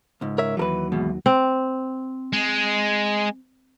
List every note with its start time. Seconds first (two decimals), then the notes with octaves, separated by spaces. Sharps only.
0.21 C#2 G#2
0.38 A#4 C#5 E5
0.57 D#2 E3 F#3 A#4 B4
0.92 E2 G#2 B2
1.26 C4
2.33 G#3